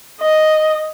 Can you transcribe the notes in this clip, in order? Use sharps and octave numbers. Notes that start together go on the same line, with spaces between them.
D#5